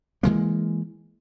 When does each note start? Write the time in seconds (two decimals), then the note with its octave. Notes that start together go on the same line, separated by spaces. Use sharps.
0.23 E3 F3 G#3 A#3